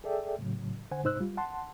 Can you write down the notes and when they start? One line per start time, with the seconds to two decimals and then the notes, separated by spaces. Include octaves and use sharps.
0.04 G#4 A4 D5 E5 G5
0.39 A2 C#3 F#3
0.91 D3 C5 F#5 G#5
1.04 G#2 C3 D#4 C5 E6 F#6
1.20 G3 F4
1.37 F#5 A5 C6